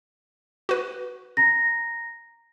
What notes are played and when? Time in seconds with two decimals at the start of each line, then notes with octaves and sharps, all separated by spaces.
0.69 F#4 B4
1.37 A#5 A#6